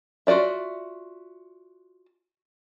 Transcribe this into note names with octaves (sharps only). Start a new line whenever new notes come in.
F4 F#4 B4 D5 E5